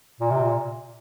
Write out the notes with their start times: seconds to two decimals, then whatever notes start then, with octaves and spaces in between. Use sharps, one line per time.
0.20 A#2
0.31 C3
0.43 A#2